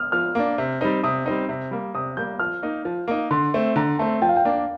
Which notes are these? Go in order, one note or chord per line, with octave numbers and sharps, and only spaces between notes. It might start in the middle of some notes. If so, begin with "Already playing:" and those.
Already playing: D#6 F6
F3 F6
A#3 D4
C3
G3 C4 D#4
C3 D#6
G3 C4 D#4
C3
G3 A#3
C3 D#6
G3 A#3 G6
F3 F6
A#3 D#4
F3
A#3 D#4
D3 C6
A3 C4
D3 A#5
A3 C4 A5
F3 G5
F5
G5
A#3 D4